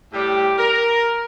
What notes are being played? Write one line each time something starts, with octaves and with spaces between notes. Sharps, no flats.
A2 G3 G4
A#4